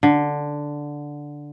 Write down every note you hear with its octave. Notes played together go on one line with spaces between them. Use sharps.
D3